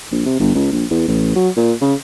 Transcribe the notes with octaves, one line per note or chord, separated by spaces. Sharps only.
A#1
C3
G1
C#2
A#1
E2
A1
F#3
A#2
C#3